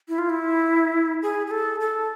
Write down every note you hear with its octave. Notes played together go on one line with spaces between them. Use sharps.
E4
F4
E4
G#4
G#4
A4
A4